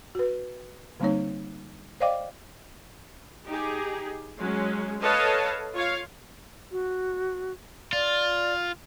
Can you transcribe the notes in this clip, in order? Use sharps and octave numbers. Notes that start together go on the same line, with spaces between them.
F#4 B4
D3 G3 A#3 C4 D#4 C#5
C5 D5 D#5 F5 G5 D6
D#4 G4 G#4
F#3 G#3 C#4
A4 B4 C#5 D#5 F5 A5
F4 C#5 F5
F#4
F4 D5